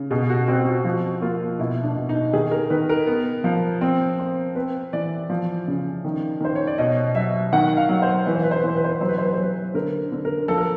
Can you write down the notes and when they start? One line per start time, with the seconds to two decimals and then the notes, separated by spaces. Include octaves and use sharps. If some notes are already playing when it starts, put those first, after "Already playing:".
Already playing: C#3
0.11 B2 G#4
0.30 F#4
0.48 C4 F#4
0.62 F4
0.67 F#4
0.84 F3 F#4
1.22 A#3 F4
1.59 B2 E4
1.84 D4
1.96 B2
2.09 D#4
2.33 D#3 G#4
2.51 A#4
2.70 D#3 B4
2.89 A#4
3.07 B3
3.44 F3
3.81 C4
4.19 C4
4.55 C4 B4
4.93 E3 D5
5.29 F3
5.67 C#3
6.05 D#3
6.41 D#3 C5
6.55 C#5
6.67 D5
6.78 B2 D#5
7.15 F#3 E5
7.53 D#3 F#5
7.77 F5
7.89 F#3
8.02 C5
8.26 E3 B4
8.35 C5
8.43 B4
8.51 C5
8.59 B4
8.64 E3 C5
8.76 B4
8.84 C5
8.93 B4
9.01 F#3 C5
9.08 B4
9.18 C5
9.25 B4
9.33 C5
9.38 F#3 B4
9.74 D3 A#4
10.12 D3
10.25 A#4
10.48 F3 A4
10.58 A#4